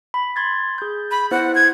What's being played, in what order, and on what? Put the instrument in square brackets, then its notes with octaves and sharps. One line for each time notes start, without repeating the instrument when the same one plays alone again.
[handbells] B5
C6 G#6 A6
G#4 G6
[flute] B5
[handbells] B3 E4 C5 [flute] F#5
[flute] G#6